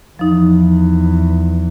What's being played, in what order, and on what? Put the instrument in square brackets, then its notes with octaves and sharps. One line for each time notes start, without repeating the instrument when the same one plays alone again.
[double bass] E2 [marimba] F3 D#4